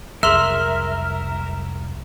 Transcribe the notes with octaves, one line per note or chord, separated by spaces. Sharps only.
C2 F2 F#3 G#4 A#4 E5 C6 F6